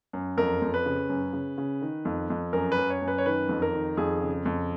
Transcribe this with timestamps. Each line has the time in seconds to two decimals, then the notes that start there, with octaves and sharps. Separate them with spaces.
0.13 F#2
0.37 F2 A#4
0.62 F2
0.74 B4
0.86 C#3
1.09 F#2
1.33 C#3
1.58 C#3
1.82 D#3
2.05 F2
2.30 F2
2.53 F#2 A#4
2.72 B4
2.78 F#2
2.90 C#5
3.02 F#2
3.08 B4
3.18 C#5
3.26 D#3 B4
3.49 F2
3.62 A#4
3.74 D#3
3.97 F2 G#4
4.21 C#3
4.45 F2